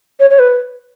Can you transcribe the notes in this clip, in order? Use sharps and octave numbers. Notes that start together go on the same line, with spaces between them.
C#5
C#5
B4